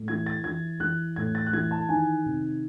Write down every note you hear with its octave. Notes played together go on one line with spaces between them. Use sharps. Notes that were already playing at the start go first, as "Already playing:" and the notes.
Already playing: A2
E3 G#6
A6
E3 G#6
E3 F#6
A2 G#6
A6
F#6
E3 G#6
A5
D#3 G#5
C3